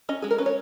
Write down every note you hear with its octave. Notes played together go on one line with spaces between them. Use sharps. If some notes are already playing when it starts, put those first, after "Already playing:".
C#4 D#5
G#3 G#4
A#4
C#4 B4
C#5